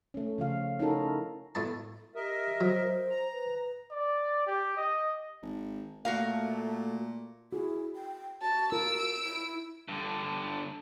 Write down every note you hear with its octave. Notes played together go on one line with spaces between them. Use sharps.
A3 C#4
C#3 F3 F5
C#4 D#4 E4 F#4 A4 A#4
A2 B3 A5
G4 A#4 D#5 E5
F#3 C5
A#5
B4
D5
G4
D#5
G#1
A#2 A3 F#4 A#4 F5
E4 F#4 G#4
G5
F#4 A5
F4 A#4 E6 D7
E4
G2 D3